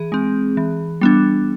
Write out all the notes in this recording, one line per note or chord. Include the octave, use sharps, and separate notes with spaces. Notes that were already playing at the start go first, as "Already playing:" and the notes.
Already playing: E3 G#4
G#3 C4
E3
G3 B3 D4